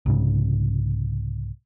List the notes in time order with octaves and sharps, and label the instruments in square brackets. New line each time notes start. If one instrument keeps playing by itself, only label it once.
[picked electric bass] C2 G#2 C#3